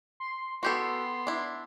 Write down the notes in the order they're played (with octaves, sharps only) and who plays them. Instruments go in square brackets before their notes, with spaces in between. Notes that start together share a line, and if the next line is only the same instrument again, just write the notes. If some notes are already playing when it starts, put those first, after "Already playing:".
[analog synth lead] C6
[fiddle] B3 [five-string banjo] F#4 G4 A4 [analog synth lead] C6
[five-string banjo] D4 E4